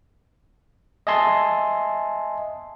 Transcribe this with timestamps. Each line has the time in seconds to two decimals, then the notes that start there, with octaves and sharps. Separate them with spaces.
1.07 D#5 E5 G#5 A5 C6